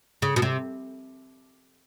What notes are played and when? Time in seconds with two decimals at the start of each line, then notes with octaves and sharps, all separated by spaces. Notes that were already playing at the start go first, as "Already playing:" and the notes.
0.22 C#3
0.36 B2
0.42 C3